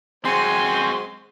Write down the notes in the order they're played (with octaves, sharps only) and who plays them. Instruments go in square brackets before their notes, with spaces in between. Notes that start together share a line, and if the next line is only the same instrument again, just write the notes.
[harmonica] F#3 G#3 C5 [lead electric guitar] C4 F#4 [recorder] G#5 [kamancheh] C6